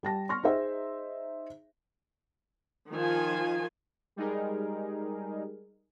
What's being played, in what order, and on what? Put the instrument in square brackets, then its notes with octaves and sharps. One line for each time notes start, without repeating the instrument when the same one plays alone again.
[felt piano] G3 A5 A#6
C6 C#6 F6 A#6
D#4 G#4 C5 E5
[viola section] D#3 F3 F4 G#5
[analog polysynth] G3 G#3 D#4 G#4 A#4